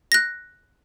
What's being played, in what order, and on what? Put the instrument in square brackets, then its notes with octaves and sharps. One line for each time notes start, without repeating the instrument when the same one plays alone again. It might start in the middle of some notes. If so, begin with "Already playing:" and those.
[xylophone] F#6 A#6